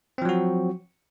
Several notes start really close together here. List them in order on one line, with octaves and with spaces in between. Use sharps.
C4 F3 F#3 F#4